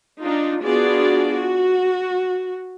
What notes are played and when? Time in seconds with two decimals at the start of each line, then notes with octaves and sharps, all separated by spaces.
0.21 D4 D#4 F4
0.63 B3 D4 F4 F#4 G#4 D5
1.31 F#4